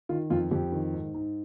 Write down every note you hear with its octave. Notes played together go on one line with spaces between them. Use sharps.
D#3 F4
F2 F4
F2 G4
D#3
G#2
G#2